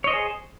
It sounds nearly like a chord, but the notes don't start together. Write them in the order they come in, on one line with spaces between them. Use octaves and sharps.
C#5 D#5 C5 G#4